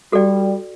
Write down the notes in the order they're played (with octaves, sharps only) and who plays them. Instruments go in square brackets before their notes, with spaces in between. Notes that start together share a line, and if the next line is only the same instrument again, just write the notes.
[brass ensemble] G3 [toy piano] F#4 A4 D5 G5